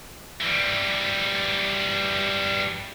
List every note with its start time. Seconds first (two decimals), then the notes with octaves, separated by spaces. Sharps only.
0.41 E3 G3